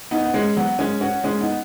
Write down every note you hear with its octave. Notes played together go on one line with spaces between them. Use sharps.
B3 D#4
B3
G#3 C#4
F#3 B3
G#3 C#4
C#4 F#4
G#3 C#4
B3 D#4